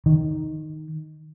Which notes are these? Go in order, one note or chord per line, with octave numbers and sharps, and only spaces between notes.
D#3